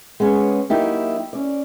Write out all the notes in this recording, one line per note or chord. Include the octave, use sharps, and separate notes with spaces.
G#3 B3 C#4
F#3 A#3 D#4 E4 G4
C#4 D5